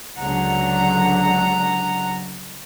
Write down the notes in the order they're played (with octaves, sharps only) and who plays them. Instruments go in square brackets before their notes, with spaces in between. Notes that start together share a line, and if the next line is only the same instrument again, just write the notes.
[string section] C#2 D3 F#3 [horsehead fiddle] F#5 A#5